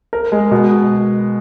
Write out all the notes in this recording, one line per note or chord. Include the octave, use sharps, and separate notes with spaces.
A#4
G#3
B2